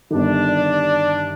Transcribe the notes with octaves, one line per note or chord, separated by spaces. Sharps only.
G1 G2 D#3 D4